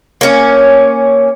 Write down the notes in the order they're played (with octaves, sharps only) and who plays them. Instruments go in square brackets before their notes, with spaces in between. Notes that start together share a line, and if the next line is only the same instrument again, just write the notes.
[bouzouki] A#3 C#4